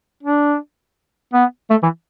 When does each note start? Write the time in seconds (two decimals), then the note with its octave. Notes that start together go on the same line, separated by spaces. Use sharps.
0.23 D4
1.33 B3
1.70 A3
1.83 E3